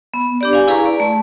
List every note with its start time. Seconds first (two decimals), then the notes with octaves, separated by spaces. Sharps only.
0.14 B3
0.41 D4 G4 D5
0.53 F5 G#5
0.68 E4 G#4 B4 F5 A#5 C#6
0.85 D5
1.00 A3